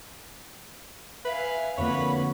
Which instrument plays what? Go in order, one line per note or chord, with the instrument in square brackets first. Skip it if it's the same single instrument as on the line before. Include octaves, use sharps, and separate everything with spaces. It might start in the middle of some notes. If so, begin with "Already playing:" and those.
[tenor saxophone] B4 [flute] E5 [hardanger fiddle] F5 G#5
[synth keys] F2 D3 A#3 [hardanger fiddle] F#4 B4 [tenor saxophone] C#5 [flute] B5